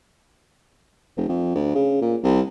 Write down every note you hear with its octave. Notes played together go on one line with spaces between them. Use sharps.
F1
F2
D2
C#3
A#2
C2